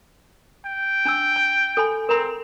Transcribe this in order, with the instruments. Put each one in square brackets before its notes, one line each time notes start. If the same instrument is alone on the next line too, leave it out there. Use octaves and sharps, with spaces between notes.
[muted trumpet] G5
[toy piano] D4 A5 E6
A5
A4 G#5 B5
[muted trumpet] C4 [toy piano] A#4 A#5 B5